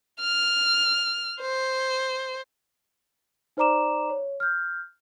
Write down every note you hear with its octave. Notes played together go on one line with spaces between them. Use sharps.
F6
C5
D#4 C5 D5 A#5 D6 E7
C#5
F6 G6